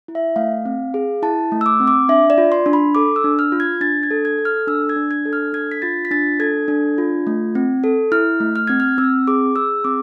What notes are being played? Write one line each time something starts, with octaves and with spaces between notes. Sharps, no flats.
E4
E5
A3 F5
C4
G#4
E4 A5
A3
E6
D6
C4
D6
D4 E5
D5
F4
C6
D4
B5
A4 D6
E6
D4
F6
F4
G#6
D4 A6
G#6
A4
G#6
A4
F6
D4 E6
G#6
D4
G#6
A4
F6
D4 G#6
B6
F4 A6
B6
D4 A6
A4 G#6
D4
F4
A3
C4
A4
E4 F6
A3
F6
C4 G#6
F6
C4 E6
G#4 D6
G#4 E6
C4 D6